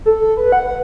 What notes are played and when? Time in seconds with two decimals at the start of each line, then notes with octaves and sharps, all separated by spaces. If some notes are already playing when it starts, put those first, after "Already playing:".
0.06 A4
0.37 B4
0.52 F#5